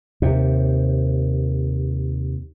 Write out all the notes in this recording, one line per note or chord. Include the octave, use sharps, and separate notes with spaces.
D#2 C3